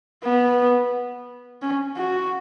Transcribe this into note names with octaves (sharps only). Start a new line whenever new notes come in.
B3
C#4
F#4